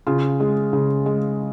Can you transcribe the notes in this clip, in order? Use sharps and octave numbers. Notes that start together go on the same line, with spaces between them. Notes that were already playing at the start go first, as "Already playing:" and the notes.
C#3 F4
G#3
C#3
G#3